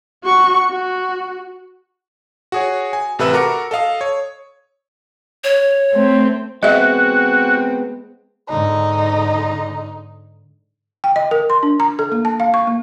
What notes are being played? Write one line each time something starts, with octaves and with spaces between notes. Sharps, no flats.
F#4 C#6
F#4
F#4 G#4 C#5
G#5
A1 C3 A4 B4 E5 E6
F#4 A4 A#4 A#5 D6 C#7
A4 D#5 F5 D#6
C#5
C#5
A3 C4
G#3 B3 C4 F#4 D#5 E5
G#2 D3 D#4
G5
D#5
A#4
C6
D4
A#5
A4
A#3
A5
F5
C#6
A#3